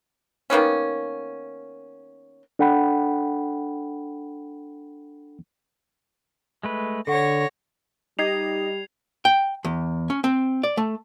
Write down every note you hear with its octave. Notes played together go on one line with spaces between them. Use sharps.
D#3 A#3 B3 C#4
D4 A4 F#5 G5 B5
G#3 A3 B4
D3 A4 C#5 F#5 C#6 A#6
G3 D#4 G4 D#5 G#6 C7 F7
G5
E2
C#4
C4
D5
A3